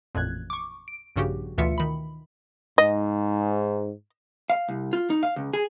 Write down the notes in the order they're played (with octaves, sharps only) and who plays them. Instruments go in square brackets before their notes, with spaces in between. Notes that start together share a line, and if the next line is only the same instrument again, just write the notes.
[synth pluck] A1 F2 A#2 F#6 G#6
C#6 D6
D7
A#1 G2 C#3 F#4 G4
D2 B2 E3 F4 E5 C#7
D#3 B5
[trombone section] G#2 [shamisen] D#5
[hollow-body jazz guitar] F5
C2
F4
D#4
F5
C#2
G#4